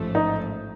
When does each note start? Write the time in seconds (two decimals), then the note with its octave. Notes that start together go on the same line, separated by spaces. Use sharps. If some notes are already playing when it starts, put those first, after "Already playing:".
Already playing: A1 G#2 F3 A3
0.15 D#4